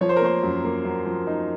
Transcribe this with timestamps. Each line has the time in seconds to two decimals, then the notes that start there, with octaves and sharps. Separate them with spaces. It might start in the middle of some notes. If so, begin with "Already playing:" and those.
0.01 F3 C#5
0.09 C5
0.16 A#4
0.22 A#3 C5
0.43 F#2
0.64 A#3
0.85 F#2
1.06 F3
1.27 D#4